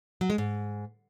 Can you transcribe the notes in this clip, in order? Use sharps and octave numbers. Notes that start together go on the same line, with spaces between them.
F#3
G#3
G#2